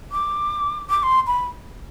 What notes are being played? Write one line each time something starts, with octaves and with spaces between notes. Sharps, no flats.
D6
D6
C6
B5